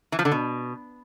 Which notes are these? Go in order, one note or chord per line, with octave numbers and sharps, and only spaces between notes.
E3
F3
D3
B2